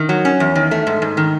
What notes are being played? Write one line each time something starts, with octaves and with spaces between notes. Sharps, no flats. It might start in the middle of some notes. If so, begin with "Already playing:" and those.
Already playing: D#3
F#3
C#4
E2
D#3
A3
G#2
G#2
D#3